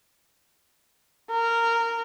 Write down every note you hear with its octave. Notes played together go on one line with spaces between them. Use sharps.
A#4